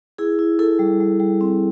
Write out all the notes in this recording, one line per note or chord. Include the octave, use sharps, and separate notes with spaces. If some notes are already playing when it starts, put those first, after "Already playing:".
E4 G#4
E4
E4 A4
G3
G3
G3
C4